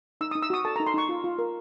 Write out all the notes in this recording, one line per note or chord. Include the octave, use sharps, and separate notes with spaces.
D#4 E6
D#6
D#4
E6
F#4 D#6
A4 A5
A#5
D#4
C6
D#4 C#6
F4
F4
A#4